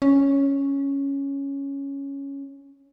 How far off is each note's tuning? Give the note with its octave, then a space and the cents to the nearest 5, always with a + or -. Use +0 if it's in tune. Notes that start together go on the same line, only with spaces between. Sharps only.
C#4 +0